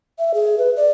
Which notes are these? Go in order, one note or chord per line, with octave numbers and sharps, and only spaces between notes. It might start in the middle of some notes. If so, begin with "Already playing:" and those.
E5
G#4
B4
D5